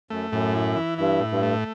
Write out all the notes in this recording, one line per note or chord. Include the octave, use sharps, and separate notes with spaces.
F#2 A3
F#2 A2
E4
E3
G2 E4
A2
G2
A3